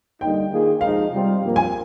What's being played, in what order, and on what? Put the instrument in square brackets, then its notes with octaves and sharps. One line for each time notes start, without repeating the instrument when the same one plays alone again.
[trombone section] D3 G3 A#3 D#4 [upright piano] G5
[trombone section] D#3 A#3 F4 G#4
[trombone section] C3 F3 G#3 D#4 [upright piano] F5
[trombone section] C3 G3 C4 F4
G2 F3 A#3
[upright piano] G#5